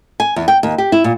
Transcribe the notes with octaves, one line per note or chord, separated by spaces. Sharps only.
G#5
E2
G5
D#2
G4
E4
A#2